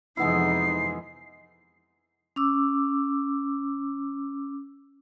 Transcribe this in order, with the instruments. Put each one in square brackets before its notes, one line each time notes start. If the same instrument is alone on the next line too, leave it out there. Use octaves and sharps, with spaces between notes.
[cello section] F2 C3 E3 [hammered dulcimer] G#3 B3 E4 [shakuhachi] D#4 [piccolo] C7
[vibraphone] C#4 D6 E6